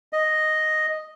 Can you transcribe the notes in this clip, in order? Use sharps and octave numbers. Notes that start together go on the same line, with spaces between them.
D#5